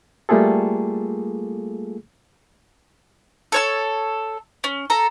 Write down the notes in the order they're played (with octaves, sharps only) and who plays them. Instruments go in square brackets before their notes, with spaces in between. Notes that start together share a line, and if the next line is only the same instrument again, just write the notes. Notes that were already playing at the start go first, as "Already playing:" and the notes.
[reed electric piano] G3 A3 A#3 F4 G#4 A4
[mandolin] A4 C#5 E6
C#4
A4 A#5